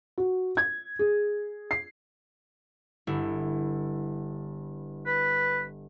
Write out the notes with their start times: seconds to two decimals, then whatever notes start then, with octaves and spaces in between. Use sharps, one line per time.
0.18 F#4
0.57 G#6
0.99 G#4
1.71 C7
3.07 G1 E4
5.06 B4